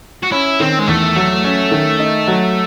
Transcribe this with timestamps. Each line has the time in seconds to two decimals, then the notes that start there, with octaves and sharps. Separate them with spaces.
0.23 F#4
0.32 C#4 E4
0.60 D#3 C4
0.79 G#3
0.88 E2 A3
1.16 F#3
1.44 C#4
1.71 D#3
1.99 D#4
2.27 F#3